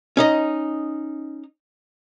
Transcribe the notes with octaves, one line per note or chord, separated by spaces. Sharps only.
C#4 D#4 D#5